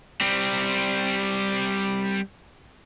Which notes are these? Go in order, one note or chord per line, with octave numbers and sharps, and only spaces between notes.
G3 C4